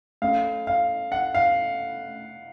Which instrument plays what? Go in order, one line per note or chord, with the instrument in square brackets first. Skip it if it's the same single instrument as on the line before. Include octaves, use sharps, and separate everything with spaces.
[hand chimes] A3 C#4 A4 [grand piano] F5
[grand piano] F5
F#5
F5